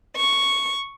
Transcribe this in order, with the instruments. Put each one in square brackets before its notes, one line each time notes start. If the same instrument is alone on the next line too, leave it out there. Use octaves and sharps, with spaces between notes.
[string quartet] C#6